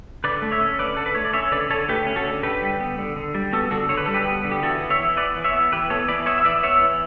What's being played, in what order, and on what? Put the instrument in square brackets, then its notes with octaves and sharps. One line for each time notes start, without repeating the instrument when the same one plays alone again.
[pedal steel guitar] D3 B4 D5
A3
C#5 E5
C#4
D3 B4 D5
D3 A4
B4
A3 C#5
D5
C#4 C#5 E5
D3 B4 D5
D3 A4 C#5
A3 G4 B4
C#4
F#4 A4
D3
D3 G4 B4
G3
B3
D3
D3
G3
B3 F#4 A4
D3 F#4 A4
D3 C#5
B4
G3 A4
G4 B4
B3
D3
G4
E3 F#4 A4
B3
C#5 E5
E3
B3 B4 D5
E3
C#5 E5
B3
E3 G4 B4
B3 A4 C#5
E3 B4 D5
B3 C#5 E5
E5
E3 B4 D5
B3 C#5 E5
E3